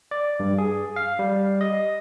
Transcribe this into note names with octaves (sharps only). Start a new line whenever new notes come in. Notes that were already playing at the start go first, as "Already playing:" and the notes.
D5
G2
G#4
F5
G3
D#5